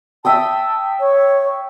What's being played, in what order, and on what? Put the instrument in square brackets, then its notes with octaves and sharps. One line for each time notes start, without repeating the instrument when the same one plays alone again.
[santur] E5 G5 D#6 [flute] A5
[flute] C#5